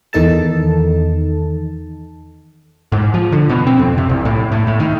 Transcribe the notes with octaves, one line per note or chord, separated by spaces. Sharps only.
E2 D#3 D#4 A4 A5
G#2
F3
D3
B2
C4
F2
C3
C2
A2
A2
A2
D#3